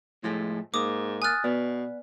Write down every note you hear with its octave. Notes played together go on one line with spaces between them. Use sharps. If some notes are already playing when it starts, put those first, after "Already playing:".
A2 F3 G#3 A3
G#2 A#3 D6 D#6
G#5 D#6 F6 F#6 A6
B2 B3 D5